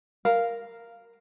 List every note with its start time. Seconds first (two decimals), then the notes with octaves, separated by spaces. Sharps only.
0.25 A#4 F5